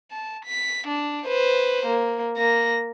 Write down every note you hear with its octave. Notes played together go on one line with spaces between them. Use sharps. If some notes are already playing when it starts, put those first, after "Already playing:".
A5
B6
D4
B4 C5
A#3
A#3 A#6